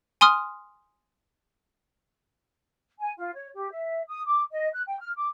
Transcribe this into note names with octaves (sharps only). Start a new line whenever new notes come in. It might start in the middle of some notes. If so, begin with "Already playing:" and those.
G#5 C6 D#6 F6
G#5
F4
C#5
G4
E5
D#6
D6
D#5
F#6
G5
F6
D6